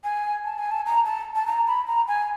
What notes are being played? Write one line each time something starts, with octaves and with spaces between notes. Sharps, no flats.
G#5
A5
G#5
A5
A#5
A5
A5
A#5
B5
A#5
G#5